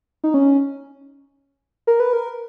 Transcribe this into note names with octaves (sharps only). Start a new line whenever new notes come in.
D#4
C#4
A#4
B4
A#4